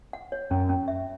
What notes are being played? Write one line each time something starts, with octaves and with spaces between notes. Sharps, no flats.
F#5
C#5
F#2 C#4
C#4
E5